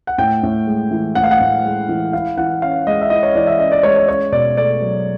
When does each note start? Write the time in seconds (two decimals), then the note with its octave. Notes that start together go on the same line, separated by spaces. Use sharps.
0.07 F#5
0.18 A2 G5
0.43 A2
0.67 G#3
0.91 E3
1.15 A2 F#5
1.23 F5
1.31 F#5
1.40 A2
1.65 G#3
1.89 E3
2.13 E4 F5
2.37 E3 F#5
2.62 C#4 F5
2.87 G#3 D#5
3.01 E5
3.10 E4 D#5
3.23 C#5
3.35 E3 D5
3.47 E5
3.59 C#4 D#5
3.72 D5
3.83 G#3 C#5
3.96 C#5
4.08 C#4 C#5
4.32 B2 D5
4.57 A3 D5
4.82 F#3